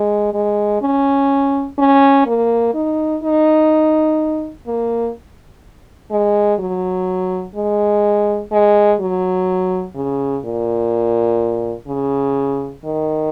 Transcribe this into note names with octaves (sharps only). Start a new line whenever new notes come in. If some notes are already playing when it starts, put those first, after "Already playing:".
Already playing: G#3
G#3
C#4
C#4
A#3
D#4
D#4
A#3
G#3
F#3
G#3
G#3
F#3
C#3
A#2
C#3
D#3